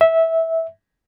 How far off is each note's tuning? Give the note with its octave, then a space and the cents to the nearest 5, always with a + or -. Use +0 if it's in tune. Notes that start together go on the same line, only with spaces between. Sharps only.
E5 -15